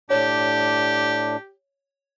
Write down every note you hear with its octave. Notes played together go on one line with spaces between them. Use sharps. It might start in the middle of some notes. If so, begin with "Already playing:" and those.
A2 D4 G4 C#5